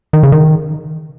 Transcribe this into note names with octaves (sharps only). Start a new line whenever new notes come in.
D#3
C#3
D#3